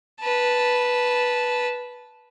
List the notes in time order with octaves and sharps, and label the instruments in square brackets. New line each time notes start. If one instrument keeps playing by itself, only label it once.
[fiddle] B4 A5